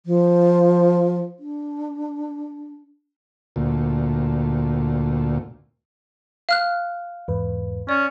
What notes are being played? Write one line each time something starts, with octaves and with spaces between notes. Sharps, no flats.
F3
D4
D2 A#2
F5 F6 F#6
E2 G#2 B4
C#4 D5